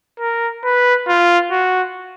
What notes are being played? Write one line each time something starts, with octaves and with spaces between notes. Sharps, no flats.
A#4
B4
F4
F#4